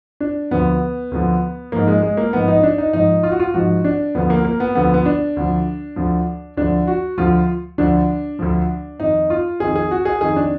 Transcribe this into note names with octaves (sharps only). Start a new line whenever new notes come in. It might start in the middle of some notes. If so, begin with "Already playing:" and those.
D4
D2 D3 F3 B3
D2 D3 F3
G#2 F3 A#3
G#3
G#3
A#3
G#2 F3 B3
D#4
D4
D#4
G#2 F3 D#4
F4
F#4
F4
G#2 F3 F#4
D4
D2 D3 F3 B3
A#3
A#3
B3
D2 D3 F3 B3
B3
D4
D2 D3 F3
D2 D3 F3
D2 D3 F3 D4
F#4
D2 D3 F3 F4
D2 D3 F3 D4
D2 D3 F3
F2 D#3 D#4
F4
F2 D#3 G#4
G#4
F#4
G#4
F2 D#3 G#4
D4